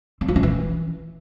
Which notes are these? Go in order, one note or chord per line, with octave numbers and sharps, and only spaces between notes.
C4
F4
C#4
E3